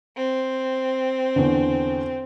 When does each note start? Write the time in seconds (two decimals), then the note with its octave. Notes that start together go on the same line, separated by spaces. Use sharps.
0.16 C4
1.36 E2 D3